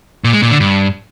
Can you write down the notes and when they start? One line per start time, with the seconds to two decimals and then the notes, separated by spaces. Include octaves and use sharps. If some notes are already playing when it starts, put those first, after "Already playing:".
0.24 A#2
0.33 G#3
0.42 A#2
0.51 D3
0.60 G2